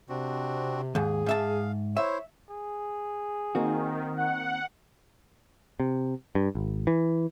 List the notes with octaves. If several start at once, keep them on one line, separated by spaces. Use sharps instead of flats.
C3 C4 D4 F#4
D#2 G#2 G#4
G#2 E5 F5 A5
E4 C5 C#5 E5
G#4
D#3 A#3 C4 F#4
F#5
C3
G2
G#1
E3